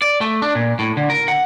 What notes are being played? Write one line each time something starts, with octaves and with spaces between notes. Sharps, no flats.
D5
A3
D4
A#2
A2
D3
A#4
F#5